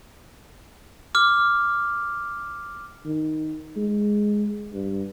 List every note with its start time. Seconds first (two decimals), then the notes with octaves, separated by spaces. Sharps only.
1.15 D6 F6
3.05 D#3
3.76 G#3
4.73 G2